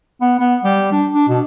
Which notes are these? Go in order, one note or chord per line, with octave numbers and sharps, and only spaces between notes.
B3
B3
G3
D4
D4
B2